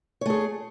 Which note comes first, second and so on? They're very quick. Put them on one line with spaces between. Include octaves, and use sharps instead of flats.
C#5 A3 G#4